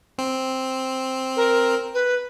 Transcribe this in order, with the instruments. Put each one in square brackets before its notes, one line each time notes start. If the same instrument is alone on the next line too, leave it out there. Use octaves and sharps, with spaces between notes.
[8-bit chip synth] C4
[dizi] A#4
B4